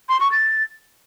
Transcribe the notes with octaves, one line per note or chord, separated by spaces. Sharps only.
C6
C#6
A6